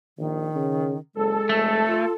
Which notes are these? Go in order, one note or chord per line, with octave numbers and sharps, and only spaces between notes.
A#1 D#3
C#3
F#1 G#3 A4
F1 A3
F4